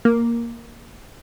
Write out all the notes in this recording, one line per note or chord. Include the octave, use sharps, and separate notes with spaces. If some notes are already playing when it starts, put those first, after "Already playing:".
A#3